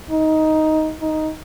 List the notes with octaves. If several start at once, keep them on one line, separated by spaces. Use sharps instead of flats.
D#4
D#4